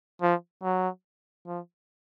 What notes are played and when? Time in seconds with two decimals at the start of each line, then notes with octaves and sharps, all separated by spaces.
0.22 F3
0.63 F#3
1.47 F3